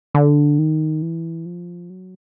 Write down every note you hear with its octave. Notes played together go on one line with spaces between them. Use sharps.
D3
D#3
E3
F3
F#3